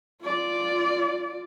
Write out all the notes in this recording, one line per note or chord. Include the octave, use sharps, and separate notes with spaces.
F4 D5